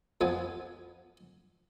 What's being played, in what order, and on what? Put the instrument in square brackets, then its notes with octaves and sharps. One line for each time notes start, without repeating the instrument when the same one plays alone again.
[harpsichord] F2 F3 B3 G#5